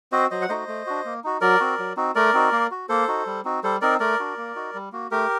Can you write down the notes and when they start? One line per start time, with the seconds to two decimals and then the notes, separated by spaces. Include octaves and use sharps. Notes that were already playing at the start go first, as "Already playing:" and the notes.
0.12 C4 F#4 C5 D#5
0.31 F#3 C5 D#5
0.42 F#5
0.49 A3 D#4 F#4 C5 D#5
0.68 A3
0.87 D4 F#4
1.05 A#3
1.24 D#4 F#4
1.41 F#3 A#4 D5
1.60 C4 F#4
1.79 F#3
1.97 C4 D#4 F#4
2.15 A3 A#4 D5
2.34 C4 D#4 F#4
2.52 A#3
2.71 F#4
2.89 A#3 A4 C5
3.08 D#4 F#4
3.27 G3
3.45 C4 D#4 F#4
3.63 G3 A4 C5
3.81 C4 D#4 A#4 D5
4.00 A3 A#4 D5
4.19 D4 F#4
4.37 A#3
4.55 D#4 F#4
4.74 G3
4.92 A#3 F#4
5.11 A3 G4 A#4